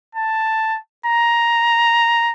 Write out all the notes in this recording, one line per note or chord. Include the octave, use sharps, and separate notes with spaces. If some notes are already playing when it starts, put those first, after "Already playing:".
A5
A#5